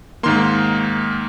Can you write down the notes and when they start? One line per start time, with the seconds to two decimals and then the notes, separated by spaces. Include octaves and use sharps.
0.23 G#2 D#3 A#3 C6